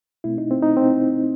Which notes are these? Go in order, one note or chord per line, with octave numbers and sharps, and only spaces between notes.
B2 A3 C4 E4
D#4
C4
D#4
C4